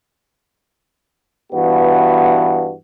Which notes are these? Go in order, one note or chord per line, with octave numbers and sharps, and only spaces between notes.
G2 E3 B3 F#4